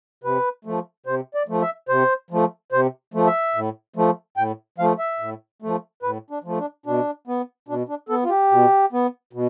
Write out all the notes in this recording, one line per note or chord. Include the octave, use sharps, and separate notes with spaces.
C3 B4
F3 A3
C3 C5
D5
F3 A3
E5
C3 C5
F3 A3
C3 C5
F3 A3
E5
A2
F3 A3
A2 G5
F3 A3 F5
E5
A2
F3 A3
A2 B4
D4
F3 A3
D4
B2 D4
B3
B2 D4
D4
B3 A4
F4
G4
B2
B3
B2